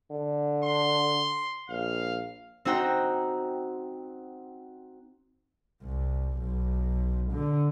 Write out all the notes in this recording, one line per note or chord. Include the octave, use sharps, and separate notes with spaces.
D3
C6
A#1 F5
C4 D#4 F#4 F#5 G5 A#5
C2
B1
D3